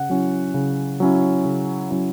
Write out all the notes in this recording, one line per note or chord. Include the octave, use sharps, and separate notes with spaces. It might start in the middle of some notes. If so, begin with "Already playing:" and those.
Already playing: C#3 F#5
F#3 C#4 E4
C#3
F#3 C#4 E4
C#3
F#3 C#4 E4